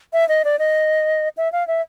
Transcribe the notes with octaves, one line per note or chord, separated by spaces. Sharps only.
E5
D#5
D5
D#5
E5
F5
E5